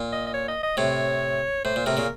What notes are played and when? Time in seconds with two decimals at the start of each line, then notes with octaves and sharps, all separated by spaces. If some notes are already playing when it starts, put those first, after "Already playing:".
Already playing: A#2
0.12 D#5
0.27 D#5
0.34 C#5
0.48 D#5
0.63 D#5
0.77 A2 C3 C#5
1.65 A2 C5
1.76 A#2
1.86 A2 C3 A#4
1.97 A#2 C#3